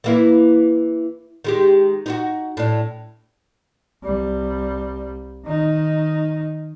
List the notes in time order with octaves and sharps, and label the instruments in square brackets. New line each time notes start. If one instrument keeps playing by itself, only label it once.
[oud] E3 A#3 E4
D#3 G#3 G4
D#4 F4 F#4
A2 D4
[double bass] C2 G3
D#3 D#4